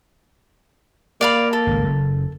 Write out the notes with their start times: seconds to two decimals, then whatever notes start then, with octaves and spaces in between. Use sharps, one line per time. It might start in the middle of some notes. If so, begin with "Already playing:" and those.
1.21 A#3 D5 F5 B5
1.53 A4
1.67 G#1 C#2
1.84 F#1 F#2